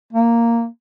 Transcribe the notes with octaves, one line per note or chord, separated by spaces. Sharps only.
A#3